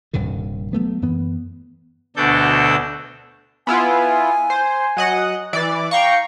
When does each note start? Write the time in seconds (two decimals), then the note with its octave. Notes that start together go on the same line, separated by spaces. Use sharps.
0.13 D#1 G2 C3 D#3
0.73 F#3 A3 B3
1.02 F#2 E3 B3
2.16 D2 B2 D4 A4 G6
3.67 B3 E4 F4 G#5
4.50 C5
4.97 F#3 D#5 F#5
5.53 E3 D5
5.91 F5 G5 A#5 C#6